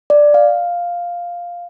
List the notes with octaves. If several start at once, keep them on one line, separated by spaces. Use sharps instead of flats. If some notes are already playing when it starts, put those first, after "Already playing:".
D5
F5